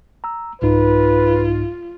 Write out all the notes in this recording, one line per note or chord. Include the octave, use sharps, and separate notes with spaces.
A#5 E6
C2 G#2 D#4 F4 B4